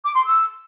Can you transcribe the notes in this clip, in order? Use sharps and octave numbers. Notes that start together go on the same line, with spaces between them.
D6
C6
E6